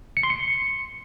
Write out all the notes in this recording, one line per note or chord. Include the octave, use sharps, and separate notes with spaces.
C#7
C6
C#7